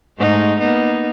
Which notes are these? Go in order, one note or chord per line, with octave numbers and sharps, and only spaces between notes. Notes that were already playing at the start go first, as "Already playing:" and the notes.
G#2 A3 D#4
A#3 B3 D#4